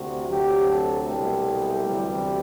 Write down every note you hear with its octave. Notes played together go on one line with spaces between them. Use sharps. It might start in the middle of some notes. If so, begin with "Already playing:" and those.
Already playing: D2 C3 F#4
D2 C3 F#3 G4
A4
C2 B2 F#3 A3 G4
D2 C3 E3 G3